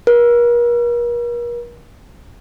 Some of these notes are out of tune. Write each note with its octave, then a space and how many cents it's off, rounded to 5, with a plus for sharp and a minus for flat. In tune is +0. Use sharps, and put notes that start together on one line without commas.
A#4 +40